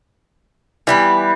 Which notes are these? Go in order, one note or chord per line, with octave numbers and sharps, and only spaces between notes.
E3 G3 B3 G4 B4